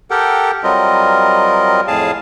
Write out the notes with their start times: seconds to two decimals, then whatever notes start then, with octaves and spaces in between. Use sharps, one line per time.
0.11 G4 A4 A#4 F#5 G5
0.64 F#3 G3 C4 F4 A#4 D#5
1.88 F2 A2 G#4 F5 A5